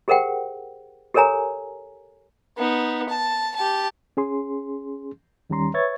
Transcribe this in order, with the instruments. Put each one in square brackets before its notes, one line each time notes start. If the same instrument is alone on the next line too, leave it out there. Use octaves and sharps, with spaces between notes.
[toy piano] G4 G#4 A#4 C5 F#5 G5
G4 A4 A#4 C#5 G#5 A#5
[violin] B3 D#4
A5
G4 A5
[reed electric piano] C#4 G#4 C6
D#2 D#3 G3 C#4 A#5 C6
B4 C#5 E5 C#6 G#6 A6